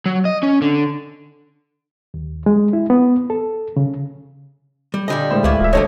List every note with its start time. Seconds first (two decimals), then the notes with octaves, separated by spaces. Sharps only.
0.06 F#3
0.25 D#5
0.43 C#4
0.62 D3
2.14 D#2
2.46 G#3
2.73 E4
2.90 B3
3.30 A4
3.77 C#3
4.94 G3
5.08 A#2 D3 G3 D#5
5.31 A2 E3 G#3 C5
5.44 C#2 B3 E4 F5 C#6 D6
5.60 D1 F4 E5
5.73 D#2 D3 F#3 A4 C5 C#5 D#5